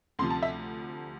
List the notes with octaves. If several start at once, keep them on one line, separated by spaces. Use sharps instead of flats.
D2 C3 F3 C6
A5
E5